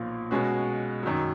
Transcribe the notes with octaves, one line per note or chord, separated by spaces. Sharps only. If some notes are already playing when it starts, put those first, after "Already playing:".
Already playing: B1 A#2 F3
B2 G#3 C#4 F#4
F#2 D#3 F#3